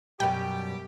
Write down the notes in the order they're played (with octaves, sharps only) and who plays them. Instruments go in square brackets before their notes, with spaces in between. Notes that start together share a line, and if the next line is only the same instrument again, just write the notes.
[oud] F#2 B2 G3 [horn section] G4 [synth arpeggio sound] G5